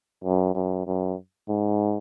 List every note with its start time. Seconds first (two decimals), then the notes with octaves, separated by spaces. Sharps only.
0.24 F#2
0.55 F#2
0.87 F#2
1.48 G#2